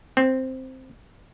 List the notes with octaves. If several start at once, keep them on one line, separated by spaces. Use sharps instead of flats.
C4